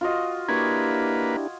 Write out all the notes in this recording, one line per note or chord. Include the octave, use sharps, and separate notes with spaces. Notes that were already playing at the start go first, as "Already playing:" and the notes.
F4 F#4 D#5
A#3 D4 E4 G4 B4 C#6 G#6